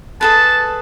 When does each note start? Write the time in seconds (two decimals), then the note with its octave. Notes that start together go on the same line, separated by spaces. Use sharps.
0.21 G#4 A4 B4 A5